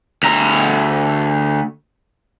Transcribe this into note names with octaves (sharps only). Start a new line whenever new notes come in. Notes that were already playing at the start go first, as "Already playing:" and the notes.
D2 A#5